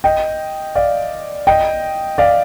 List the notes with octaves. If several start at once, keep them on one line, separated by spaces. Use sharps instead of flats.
D#5 G5
D5 F5
D#5 G5
D5 F5